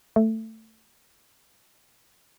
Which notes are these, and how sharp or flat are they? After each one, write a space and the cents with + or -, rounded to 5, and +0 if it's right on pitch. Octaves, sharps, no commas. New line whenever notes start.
A3 +15